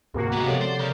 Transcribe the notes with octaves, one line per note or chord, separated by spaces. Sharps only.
D2 G#2 C3 A#3 F#4
G#3 B3
C3 F3 G4 A4 C#5 D5
C5
C#3 C#4 A#4 G6